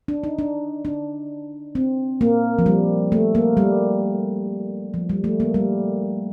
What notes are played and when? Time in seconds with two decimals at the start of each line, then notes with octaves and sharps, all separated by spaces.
0.08 D4
0.24 D#4
0.39 D4
0.85 D4
1.75 C4
2.21 A#3
2.59 F3
2.66 G3
3.12 A3
3.35 A#3
3.57 G3
4.94 F3
5.09 G3
5.24 A3
5.40 A#3
5.54 G3